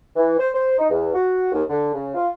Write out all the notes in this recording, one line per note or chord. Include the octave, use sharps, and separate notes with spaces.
E3
C5
C5
D#4
E2
F#4
D#2
D3
C#3
F4